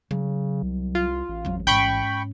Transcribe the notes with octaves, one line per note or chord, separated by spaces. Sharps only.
C#3 F#3
C2
F4
A1
F2 F#3
G#2 C#4 G5 B5 C#6